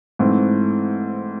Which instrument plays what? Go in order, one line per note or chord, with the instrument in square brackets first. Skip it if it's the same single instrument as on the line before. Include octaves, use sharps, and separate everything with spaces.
[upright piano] G#2 E3 A3 C4 E4